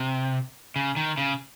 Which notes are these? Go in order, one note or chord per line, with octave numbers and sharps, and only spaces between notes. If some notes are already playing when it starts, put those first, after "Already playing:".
Already playing: C3
C#3
D#3
C#3